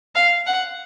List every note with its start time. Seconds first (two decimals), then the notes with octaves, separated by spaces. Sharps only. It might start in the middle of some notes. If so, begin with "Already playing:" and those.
0.15 F5
0.47 F#5